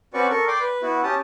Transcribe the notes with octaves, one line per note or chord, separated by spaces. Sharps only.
C4 C#4 F#4 B4 D5 C#6
A4 A#4 C#6
D5 G5 C6 D6
B4
B3 E4 F#4
C#4 G4 A5 D#6